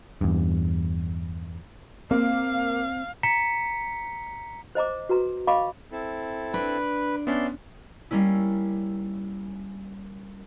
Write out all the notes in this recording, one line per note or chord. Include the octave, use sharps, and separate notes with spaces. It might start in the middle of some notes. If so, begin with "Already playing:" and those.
E2 G2
A#3 C4 F5
A#5 B6 C#7
C5 D#5 A#5 D6
F#4 B4 A#5
D#5 F5 B5 C#6 D6
C4 E4 A4
D4 B4
B3 C#4 D4 D5 E5 C6
G3 A#3 C#4 E4